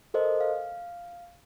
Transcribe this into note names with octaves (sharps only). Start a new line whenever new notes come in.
A4 A#4 C5 D#5
F5